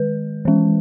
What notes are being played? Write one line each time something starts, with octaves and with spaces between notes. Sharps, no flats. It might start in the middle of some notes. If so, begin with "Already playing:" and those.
Already playing: D#3 G#3 B4
E3 G#3 C#4